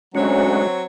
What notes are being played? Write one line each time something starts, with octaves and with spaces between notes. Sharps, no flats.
D2 F#3 G#3 C4 C#4 F#4 C#5